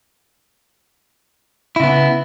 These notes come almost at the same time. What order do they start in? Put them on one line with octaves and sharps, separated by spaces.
E4 C#3 B3